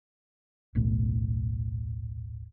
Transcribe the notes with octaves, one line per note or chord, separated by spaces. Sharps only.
D#1 B1 A2